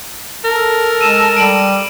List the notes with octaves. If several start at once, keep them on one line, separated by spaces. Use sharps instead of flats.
A4 A#4
G#3 D#7 E7
G3 D7 E7 F#7